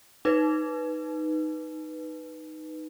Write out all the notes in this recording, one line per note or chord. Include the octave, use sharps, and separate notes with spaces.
D#4 B4